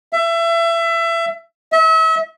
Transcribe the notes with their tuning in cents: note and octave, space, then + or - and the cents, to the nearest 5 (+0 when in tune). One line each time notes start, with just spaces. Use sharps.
E5 +25
E5 -35